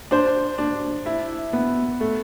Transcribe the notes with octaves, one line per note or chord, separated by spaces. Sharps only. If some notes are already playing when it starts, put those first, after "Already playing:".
D4 C5
D4
E4
B3
A3